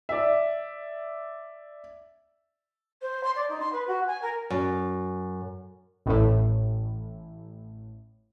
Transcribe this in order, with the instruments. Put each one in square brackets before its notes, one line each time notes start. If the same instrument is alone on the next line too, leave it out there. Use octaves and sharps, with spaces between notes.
[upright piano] D5 E5
[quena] C5
C6
D5
D#4
C6
B4
F#4
G#5
A#4
[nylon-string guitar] F#2
[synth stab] A1 A2